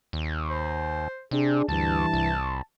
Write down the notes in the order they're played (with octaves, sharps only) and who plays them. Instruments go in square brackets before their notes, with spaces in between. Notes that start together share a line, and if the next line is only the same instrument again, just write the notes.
[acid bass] D#2
[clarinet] C5
[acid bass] C3 [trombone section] D4 G#4
[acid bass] D2 [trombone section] G2 E3 [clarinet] A5
[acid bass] C2